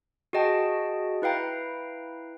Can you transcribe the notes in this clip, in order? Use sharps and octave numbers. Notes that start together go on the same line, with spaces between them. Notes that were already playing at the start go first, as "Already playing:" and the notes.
F#4 G#4 D#5 G5 A5
E4 B4 F5 G5 A#5